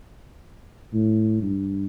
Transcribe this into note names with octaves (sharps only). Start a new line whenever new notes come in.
A2
G2